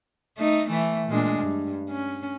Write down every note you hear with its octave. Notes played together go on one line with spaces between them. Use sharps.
A3 D#4
E3 A3
A#2 G#3 D4
G2
C#4